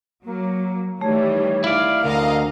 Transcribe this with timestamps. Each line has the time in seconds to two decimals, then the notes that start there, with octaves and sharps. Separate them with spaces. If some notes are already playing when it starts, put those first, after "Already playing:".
0.25 F#3 A#3
1.01 D#3 E3 G3 A3 C#5
1.64 E4 D5 F5
2.04 D2 D3 A#4 D#5 F5 A#5